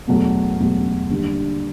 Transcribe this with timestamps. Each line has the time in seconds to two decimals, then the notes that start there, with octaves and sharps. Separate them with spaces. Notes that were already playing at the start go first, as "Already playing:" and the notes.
0.08 E2 B2 F#3 A3
0.59 E2 B2 F#3 A3
1.10 D#2 D3 G3